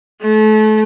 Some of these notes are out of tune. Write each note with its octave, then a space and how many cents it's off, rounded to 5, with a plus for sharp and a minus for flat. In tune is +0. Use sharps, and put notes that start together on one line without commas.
A3 -30